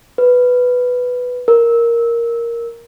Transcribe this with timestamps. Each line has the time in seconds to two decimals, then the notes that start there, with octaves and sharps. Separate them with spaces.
0.18 B4
1.48 A#4